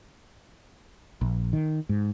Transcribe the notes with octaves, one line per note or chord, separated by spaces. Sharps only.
A#1
D#3
G#2